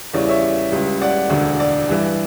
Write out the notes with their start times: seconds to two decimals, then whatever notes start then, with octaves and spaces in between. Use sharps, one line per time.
0.13 E2 C#3 G3 C#4 E4 D5
0.28 C#5 E5
0.72 C#2 C#3 G3
1.01 D5 F#5
1.30 E1 D2 D3
1.60 D5
1.89 G2 E3 G3